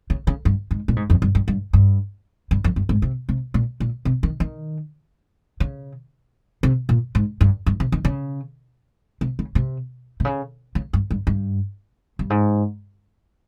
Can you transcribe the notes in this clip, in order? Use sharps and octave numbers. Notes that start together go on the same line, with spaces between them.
C#3
C#3
G2
G#2
A#2
G#2
F2
G2
G2
G2
G2
G2
F2
G2
G#2
C3
C3
A#2
A#2
C3
D#3
D#3
C#3
C3
A#2
G#2
G2
G2
C3
D#3
C#3
C3
C#3
C3
C3
C#3
C#3
G2
G2
G2
G2
G#2